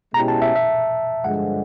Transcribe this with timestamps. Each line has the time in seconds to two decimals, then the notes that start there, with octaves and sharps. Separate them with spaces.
0.14 B2 G#3 C#4 E4 G4 A#5
0.28 A5
0.42 E5
0.55 E5
1.24 G2 D3 F3 G#3 F#5